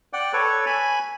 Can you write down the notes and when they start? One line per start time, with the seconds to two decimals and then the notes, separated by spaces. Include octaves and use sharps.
0.13 D5 F#5 G5
0.33 A4 B4 C#5
0.66 G#5 B5